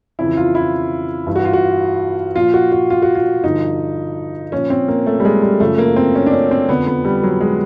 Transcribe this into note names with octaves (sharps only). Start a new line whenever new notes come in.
F2 C#3 E3 E4
F4
E4
G2 E3
F#4
F4
F#4
A#2 F3 F4
F#4
F#4
F4
F#4
F4
G2 D3 F3 D#4
A#2 F3 C#4
C4
A#3
A3
G3
G#3
G3
F#2 C#3 F3 A3
A#3
C4
C#4
D4
C#4
C4
F2 D3 F3 B3
B3
G3
F#3
G#3